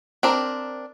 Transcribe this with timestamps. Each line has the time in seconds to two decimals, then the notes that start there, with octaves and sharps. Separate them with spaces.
0.23 C4 D4 A#4